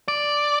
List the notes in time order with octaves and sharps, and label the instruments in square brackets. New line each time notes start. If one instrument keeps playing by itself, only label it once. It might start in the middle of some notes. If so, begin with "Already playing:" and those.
[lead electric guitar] D5